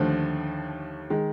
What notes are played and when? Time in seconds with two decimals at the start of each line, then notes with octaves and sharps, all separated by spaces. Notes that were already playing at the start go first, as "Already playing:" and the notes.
Already playing: D#2 D3 F3 A3
1.10 D#3 G#3